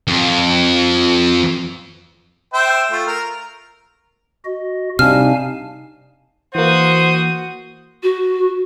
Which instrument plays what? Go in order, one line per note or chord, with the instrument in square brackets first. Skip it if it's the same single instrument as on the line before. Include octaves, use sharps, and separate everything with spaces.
[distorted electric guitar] F2
[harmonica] C5 E5 G5
A3 F4
A#4
[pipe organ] F#4 D#5
[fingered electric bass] C3 [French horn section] G3 D4 D#4 [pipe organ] F5 G#5 A5 [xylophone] F6
[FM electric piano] E3 A#3 [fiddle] F#4 D#6 [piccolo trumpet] C5
[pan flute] F#4